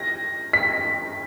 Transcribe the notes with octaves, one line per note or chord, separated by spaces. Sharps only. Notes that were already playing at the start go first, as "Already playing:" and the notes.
Already playing: A#6
B6